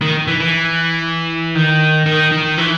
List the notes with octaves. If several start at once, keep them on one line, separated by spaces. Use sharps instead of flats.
D#3
E3
E3
D#3
D#3
D#3
E3